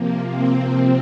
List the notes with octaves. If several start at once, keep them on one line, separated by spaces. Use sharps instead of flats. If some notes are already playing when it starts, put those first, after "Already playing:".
Already playing: C3 F3 A#3
C4
C3 F3 C4